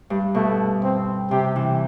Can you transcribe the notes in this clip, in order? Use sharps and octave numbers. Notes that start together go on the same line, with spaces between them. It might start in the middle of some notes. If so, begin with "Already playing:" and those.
G2
B2 A3
C4
C3 G4
E3